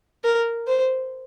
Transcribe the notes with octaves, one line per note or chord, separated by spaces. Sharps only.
A#4
C5